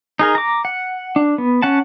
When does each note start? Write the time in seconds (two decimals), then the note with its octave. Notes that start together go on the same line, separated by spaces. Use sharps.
0.19 D#4 G#4 A#4
0.35 A#5 D6
0.65 F#5
1.16 D4
1.38 B3
1.62 C#4 F#5 A5